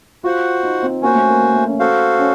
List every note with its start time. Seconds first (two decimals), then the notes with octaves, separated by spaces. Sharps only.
0.24 F4 F#4 C5 F#5
0.63 D#4
0.83 C4
1.02 A#3 C#4 F#4 C5
1.14 A3
1.29 A#3
1.41 A#3
1.54 A3
1.67 C#4
1.80 F#4 A4 C5 F5
2.19 C#4